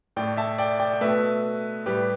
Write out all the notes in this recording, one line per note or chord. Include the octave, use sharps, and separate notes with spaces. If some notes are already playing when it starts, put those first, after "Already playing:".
A2 A3 D5 G5
E5 A5
D5 G5
D5 G5
G5
B2 A3 B4 E5
A2 G3 G4 B4